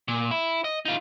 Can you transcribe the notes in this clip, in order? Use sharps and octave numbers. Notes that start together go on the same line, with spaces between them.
A#2
E4
D#5
D#4 F4